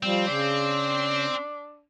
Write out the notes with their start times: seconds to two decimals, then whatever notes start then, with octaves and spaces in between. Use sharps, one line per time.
0.03 F3 G3 C4
0.27 C#3 D4